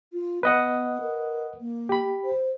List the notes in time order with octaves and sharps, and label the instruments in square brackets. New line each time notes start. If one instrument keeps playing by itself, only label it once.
[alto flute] F4
[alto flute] B3 [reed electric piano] B4 D#5 F#5
[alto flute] A#4
A#3
[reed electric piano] G4 B5
[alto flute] C5